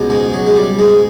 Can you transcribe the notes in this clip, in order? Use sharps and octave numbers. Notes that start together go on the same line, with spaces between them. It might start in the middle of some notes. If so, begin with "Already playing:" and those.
Already playing: C#2 B2
G#2 G#3
F#3
G#3
G3
G#2 G#3